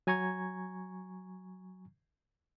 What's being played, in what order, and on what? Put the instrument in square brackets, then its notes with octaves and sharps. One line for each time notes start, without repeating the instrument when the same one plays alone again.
[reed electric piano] F#3 G#5 A#5 C#6 G#6